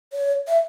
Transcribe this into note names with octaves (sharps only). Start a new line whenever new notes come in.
C#5
E5